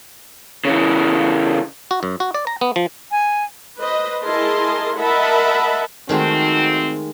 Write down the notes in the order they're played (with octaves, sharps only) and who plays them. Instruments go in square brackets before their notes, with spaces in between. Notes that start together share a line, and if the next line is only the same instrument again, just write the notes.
[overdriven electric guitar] C#3 E3
[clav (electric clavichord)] F#4
F#2
F#4
D5
A#5
B3
F3
[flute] G#5
[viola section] B4 C5 D#5
E4 G#4 A#4 D#5 A5 C6
A#4 D#5 E5 F#5 A5 B5
[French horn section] F2 C4 F#4 [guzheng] D#3 G#3 A3